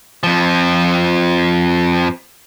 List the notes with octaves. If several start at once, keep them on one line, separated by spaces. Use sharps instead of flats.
F2 F3